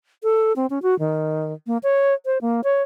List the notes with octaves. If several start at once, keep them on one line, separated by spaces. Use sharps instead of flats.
A4
C4
C#4
F#4
D#3
A#3
C#5
C5
A#3
C#5